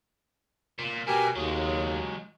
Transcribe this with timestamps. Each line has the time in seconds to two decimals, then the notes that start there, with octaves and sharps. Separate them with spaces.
0.79 A#2
1.07 B2 G4 A#4 G#5
1.36 D#2 F#3 G#3